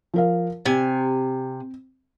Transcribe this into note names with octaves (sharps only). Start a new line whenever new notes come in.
F3 A#4 F5
C3 C4 G#5